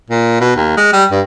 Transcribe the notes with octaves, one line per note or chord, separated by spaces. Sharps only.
A#2
B2
D#2
G#3
G3
G2